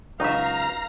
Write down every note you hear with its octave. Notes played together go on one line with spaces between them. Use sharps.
C#2 F#3 D#4 C#5 E5 F5 A#5